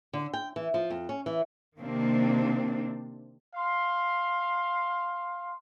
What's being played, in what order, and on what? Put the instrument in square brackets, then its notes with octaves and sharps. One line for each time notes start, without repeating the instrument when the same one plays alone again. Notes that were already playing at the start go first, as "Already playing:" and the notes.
[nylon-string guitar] D3
G5
E3
F3
F2
C#4
E3
[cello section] C3 D#3 A#3 C4 D4
[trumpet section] F5 C6